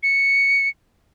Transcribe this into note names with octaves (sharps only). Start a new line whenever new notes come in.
C#7